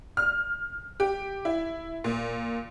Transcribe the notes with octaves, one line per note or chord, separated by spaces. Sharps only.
F6
G4
E4
A#2